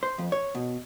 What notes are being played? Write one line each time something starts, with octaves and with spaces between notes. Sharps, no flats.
C5
F2
C#5
B2